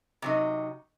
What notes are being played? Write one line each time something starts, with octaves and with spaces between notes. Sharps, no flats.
C3 F#3 D#4